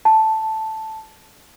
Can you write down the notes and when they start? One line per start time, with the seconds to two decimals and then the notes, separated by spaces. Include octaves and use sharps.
0.05 A5